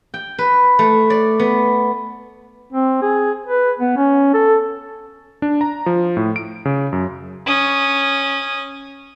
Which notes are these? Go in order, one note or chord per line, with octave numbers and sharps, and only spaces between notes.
G5
B4
A3
D5
B3
C4
G#4
B4
B3
C#4
A4
D4
A#5
F3
A2
D7
C#3
F#2
C#4 D#6